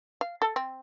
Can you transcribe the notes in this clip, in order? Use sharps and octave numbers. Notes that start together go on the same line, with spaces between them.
F5
A4
C4